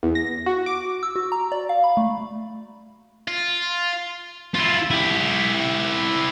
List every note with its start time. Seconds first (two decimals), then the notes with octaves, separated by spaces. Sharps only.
0.03 E2
0.15 A#6
0.46 F#4
0.66 D6
1.03 E6
1.16 F#4
1.32 A#5
1.52 D5
1.69 F5
1.84 B5
1.97 A3
3.28 F4
4.54 E4 F4
4.90 E4 G4